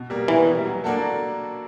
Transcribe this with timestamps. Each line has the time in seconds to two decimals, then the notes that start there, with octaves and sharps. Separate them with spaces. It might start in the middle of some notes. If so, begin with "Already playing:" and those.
Already playing: B2
0.10 G3 A#3
0.28 B2 E3
0.47 G3 A#3
0.65 F#3
0.84 A#3 D4 F#4 A4